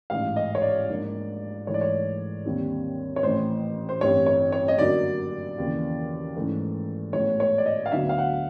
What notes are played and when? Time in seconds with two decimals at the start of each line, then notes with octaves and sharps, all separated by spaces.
0.10 A1 G#2 E3 F5
0.36 D#5
0.55 C#5
0.62 D5
0.89 G#2 F3 A#3 D4
1.67 G#2 E3 A3 C#5
1.74 D5
1.81 C#5
2.45 D#2 D3 G3 C4
3.16 C#5
3.23 A1 A2 E3 C5
3.89 C5
4.01 A1 G2 E3 G3 C4 C#5
4.26 C#5
4.52 C#5
4.68 D#5
4.78 F#2 D3 F#3 A#3 D5
5.58 D#2 C#3 E3
6.36 G#2 E3 A3 C#4
7.13 A1 A2 F3 G#3 B3 C#5
7.40 C#5
7.58 D5
7.66 D#5
7.86 F5
7.92 D2 D3 F#3 B3 D4 E5
8.09 F5
8.18 F#5